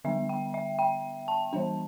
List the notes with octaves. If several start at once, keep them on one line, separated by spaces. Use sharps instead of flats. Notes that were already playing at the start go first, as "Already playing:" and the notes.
D3 G3 B3 D4 E5
G5
E5
G5
A5
E3 G3 D4